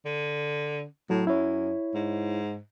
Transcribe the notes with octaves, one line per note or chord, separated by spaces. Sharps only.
D3
A2 F#3
F#2 E4 C#5
G#2